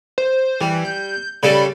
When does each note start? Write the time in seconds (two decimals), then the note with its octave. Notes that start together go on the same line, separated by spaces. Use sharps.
0.18 C5
0.61 E3 G3
0.85 G6
1.43 C#3 G3 A4 D5 B5